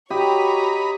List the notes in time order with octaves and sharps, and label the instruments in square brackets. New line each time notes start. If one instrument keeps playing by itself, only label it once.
[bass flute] F#4 [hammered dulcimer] G4 [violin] C#5 A#5 [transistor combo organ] D#5 B5